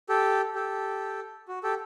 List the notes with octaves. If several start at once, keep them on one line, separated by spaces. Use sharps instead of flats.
G4 A4
G4 A4
F#4
G4 A4